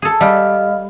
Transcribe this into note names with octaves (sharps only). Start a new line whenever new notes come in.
G#4 A4
G3 D#5 F5 F6